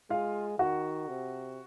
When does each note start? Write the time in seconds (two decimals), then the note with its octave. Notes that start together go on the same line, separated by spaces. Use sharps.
0.10 G#3 F4 F5
0.59 D#3 F#4 F#5
1.08 C3